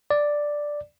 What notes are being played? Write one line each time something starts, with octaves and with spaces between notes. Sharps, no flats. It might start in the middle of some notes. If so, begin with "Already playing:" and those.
D5